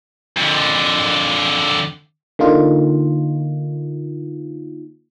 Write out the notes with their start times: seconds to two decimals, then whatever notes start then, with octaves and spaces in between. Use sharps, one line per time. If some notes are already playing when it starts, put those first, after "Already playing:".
0.37 F2 D3
2.39 D3 A#3 D#4 F4